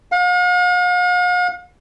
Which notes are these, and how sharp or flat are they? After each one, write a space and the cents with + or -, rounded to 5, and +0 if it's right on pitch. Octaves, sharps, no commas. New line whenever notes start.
F5 +45